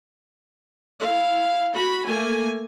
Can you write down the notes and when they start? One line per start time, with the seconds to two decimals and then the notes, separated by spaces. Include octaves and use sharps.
1.00 E4 F5
1.73 F#4 B5
2.06 A3 A#3 G#5